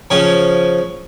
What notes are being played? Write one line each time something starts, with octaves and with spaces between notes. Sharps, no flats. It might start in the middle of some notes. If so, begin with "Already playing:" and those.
C#3 F3 C#4